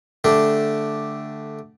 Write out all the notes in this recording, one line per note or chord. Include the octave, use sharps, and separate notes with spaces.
D3 A3 D4 G4